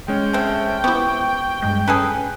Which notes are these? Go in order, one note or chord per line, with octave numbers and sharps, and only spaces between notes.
G#3 C#4 G5
A3 C4
B3 E4 G4 C5 C#6
G2 G#3
C#4 G#4 A4 B4